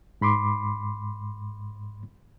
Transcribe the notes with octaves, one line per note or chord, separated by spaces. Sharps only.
G#2 B5 C6 D6